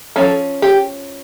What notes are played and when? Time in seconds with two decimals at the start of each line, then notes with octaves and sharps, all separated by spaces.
0.16 F3 A3 C#4 A4
0.62 G4